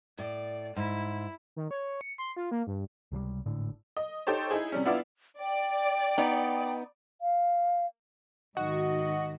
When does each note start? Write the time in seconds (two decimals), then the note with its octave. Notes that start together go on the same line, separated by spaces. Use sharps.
0.19 A2 D5
0.76 G#2 E4
1.56 D#3
1.71 C#5
2.01 C#7
2.18 C6
2.36 F4
2.51 A#3
2.67 G2
3.12 C#2 C3 F#3 G3
3.46 G#1 A2 D3 D4
3.97 D#5
4.27 D#4 G4 A4 C5 C#5
4.51 D#4 E4 G#4
4.72 C3 G3 C#4
4.85 B3 D4 E4 F4 D5 E5
5.40 D5 G5
6.18 B3 D#4
7.22 F5
8.57 G#2 D#3 F#4 D#5